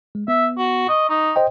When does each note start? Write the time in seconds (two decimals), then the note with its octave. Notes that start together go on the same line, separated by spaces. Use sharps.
0.15 G#3
0.28 B3 E5
0.58 F#4
0.89 D#5 C#6
1.09 D#4
1.36 C5 D#5 G5